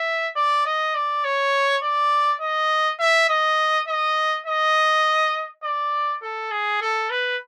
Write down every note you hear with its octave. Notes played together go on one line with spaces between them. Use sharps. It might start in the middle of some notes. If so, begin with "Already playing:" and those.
Already playing: E5
D5
D#5
D5
C#5
D5
D#5
E5
D#5
D#5
D#5
D5
A4
G#4
A4
B4